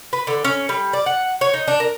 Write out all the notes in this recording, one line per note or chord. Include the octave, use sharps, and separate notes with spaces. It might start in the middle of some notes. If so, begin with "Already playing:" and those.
B4
D3
C#4
G3
D5
F#5
C#5
D#4
D4
A#4